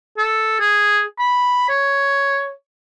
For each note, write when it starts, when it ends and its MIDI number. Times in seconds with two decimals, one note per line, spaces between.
0.17 0.60 69
0.60 1.02 68
1.19 1.66 83
1.69 2.51 73